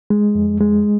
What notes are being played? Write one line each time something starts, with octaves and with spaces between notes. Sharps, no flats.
G#3
F2
G#3